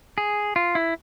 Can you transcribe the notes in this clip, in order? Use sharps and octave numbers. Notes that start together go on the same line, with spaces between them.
G#4
F4
E4